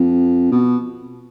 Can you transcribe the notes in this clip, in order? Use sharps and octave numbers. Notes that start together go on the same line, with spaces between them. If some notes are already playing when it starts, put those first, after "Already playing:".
Already playing: F2
B2